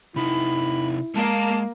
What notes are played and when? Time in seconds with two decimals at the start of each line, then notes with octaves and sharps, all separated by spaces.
0.16 C3 D#4 E4 B5
1.16 G#3 A#3 A5